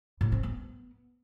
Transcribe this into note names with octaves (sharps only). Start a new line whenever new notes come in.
A2
C4
B3